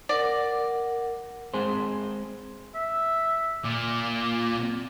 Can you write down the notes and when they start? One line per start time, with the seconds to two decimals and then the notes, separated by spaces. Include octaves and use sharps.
0.09 A#4 D5 F#5
1.54 G#3 C4 G#4 C5
2.75 E5
3.64 A#2 D6